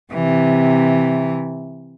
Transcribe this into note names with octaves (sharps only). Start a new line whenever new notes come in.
C3 E3